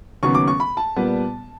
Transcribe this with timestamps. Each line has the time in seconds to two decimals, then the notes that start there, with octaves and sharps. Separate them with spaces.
0.23 D#2 C#3 F#3 B3 C#6
0.35 D6
0.48 C#6
0.60 B5
0.77 A5
0.96 A#2 G3 B3